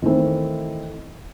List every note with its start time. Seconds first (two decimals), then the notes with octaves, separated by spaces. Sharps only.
0.02 D#3 E3 A3 C4